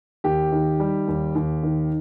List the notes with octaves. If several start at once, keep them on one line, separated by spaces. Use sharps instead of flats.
D#2 G4
D#3
G3
D#2
D#2
D#3